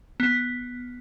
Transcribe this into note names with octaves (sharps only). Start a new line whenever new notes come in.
B3